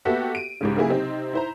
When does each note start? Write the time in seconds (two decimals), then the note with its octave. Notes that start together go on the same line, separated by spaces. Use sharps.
0.05 A#3 B3 F#4 G4 A4 E5
0.35 D7 D#7
0.61 C2 G#2 C#3
0.77 C#3 F#3 A#3 E4 G#4
0.90 C3 C4 D#4
1.33 E4 C5 A#5